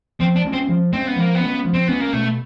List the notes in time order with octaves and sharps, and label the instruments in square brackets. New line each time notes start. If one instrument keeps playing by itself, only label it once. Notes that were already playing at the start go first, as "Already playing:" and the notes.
[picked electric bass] F3 [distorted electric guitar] C4
[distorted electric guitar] D4
[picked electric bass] G#3 C#4
[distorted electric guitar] C4
[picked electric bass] F3
[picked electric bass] G#3 C#4 [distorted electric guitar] C4
[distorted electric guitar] B3
[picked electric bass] F3 [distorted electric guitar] A#3
[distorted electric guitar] B3
[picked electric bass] G#3 C#4
F3
[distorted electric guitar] C4
[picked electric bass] G#3 C#4 [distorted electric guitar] B3
[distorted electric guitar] A#3
[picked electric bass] B2 [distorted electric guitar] A3